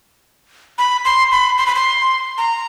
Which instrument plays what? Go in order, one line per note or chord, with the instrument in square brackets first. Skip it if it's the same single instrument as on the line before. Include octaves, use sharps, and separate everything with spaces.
[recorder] B5
C6
B5
C6
B5
C6
A#5